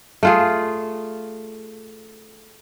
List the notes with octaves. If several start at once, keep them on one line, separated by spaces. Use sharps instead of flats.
A3 F4 G#4